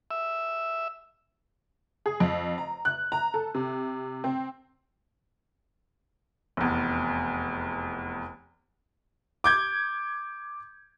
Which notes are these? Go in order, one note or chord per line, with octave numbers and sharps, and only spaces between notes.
E5
G#4
F2
A#5
F#6
A#5
A4
C3
C4
F1 E2
D6 G6 G#6